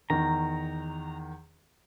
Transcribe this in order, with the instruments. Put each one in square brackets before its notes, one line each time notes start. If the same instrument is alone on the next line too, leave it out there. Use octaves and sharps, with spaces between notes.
[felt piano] E2 D#3 [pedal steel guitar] A#5